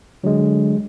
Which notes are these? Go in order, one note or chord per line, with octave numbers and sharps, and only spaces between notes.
D3 F#3 G#3